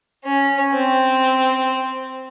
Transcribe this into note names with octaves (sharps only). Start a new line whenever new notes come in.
C#4
C4